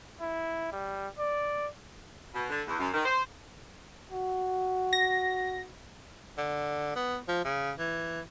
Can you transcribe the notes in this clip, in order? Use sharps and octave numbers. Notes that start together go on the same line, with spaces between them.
E4
G3
D5
B2
D3
E2
F#2
D#3
C5
F#4
A#6
D3
B3
F3
C#3
E3